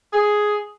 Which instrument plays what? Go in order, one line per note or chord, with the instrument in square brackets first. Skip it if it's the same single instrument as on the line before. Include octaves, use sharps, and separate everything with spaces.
[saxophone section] G#4